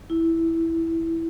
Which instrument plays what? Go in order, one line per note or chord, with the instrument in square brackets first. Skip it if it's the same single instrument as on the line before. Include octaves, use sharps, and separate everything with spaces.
[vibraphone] E4